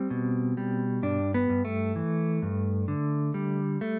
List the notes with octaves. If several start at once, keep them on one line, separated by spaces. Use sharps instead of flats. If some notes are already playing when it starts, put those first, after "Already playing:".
Already playing: G3 C4
B2
G3
G2 D4
B3
G2
A3
E3
G2
D3
G3
A3